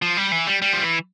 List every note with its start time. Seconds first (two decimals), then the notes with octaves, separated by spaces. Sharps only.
0.02 F3
0.17 G3
0.32 E3
0.47 G3
0.62 G3
0.73 F3
0.82 E3